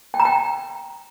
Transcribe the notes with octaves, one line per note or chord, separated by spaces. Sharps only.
G5
A#5
G5